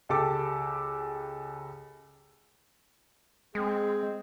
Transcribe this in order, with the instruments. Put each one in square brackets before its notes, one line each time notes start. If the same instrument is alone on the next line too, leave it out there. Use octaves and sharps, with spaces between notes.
[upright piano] C#2 G4 A4 D6
[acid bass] G#3 [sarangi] C4 [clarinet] G#4